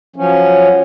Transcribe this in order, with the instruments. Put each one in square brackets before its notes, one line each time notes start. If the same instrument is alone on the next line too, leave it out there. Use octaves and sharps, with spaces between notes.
[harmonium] F3 F#3 C#4